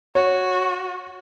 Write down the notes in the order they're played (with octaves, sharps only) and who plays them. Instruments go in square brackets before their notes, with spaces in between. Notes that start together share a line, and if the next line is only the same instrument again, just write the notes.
[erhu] F#4 [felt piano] C#5